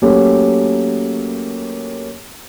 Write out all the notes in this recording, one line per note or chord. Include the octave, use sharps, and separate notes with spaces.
F#3 A3 A#3 C#4 G4